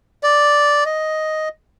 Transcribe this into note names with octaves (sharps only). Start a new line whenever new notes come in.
D5
D#5